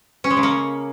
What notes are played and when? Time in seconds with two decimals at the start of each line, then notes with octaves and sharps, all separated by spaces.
0.24 C#4
0.30 G#3
0.37 C#3
0.43 A#3